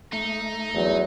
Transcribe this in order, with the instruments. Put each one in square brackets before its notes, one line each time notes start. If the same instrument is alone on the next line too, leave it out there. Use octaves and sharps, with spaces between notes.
[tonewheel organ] A3 [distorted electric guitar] D#4
[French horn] E2 [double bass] F#3